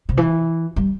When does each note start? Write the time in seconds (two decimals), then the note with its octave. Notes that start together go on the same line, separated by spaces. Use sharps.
0.09 C3
0.17 E3
0.76 G3